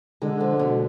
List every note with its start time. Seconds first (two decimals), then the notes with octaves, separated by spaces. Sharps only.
0.22 D3 G#3
0.40 F3
0.59 B2